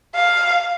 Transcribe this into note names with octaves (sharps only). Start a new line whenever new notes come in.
F5